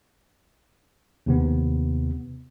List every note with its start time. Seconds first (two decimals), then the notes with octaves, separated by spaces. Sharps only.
1.26 D#2 C3 B3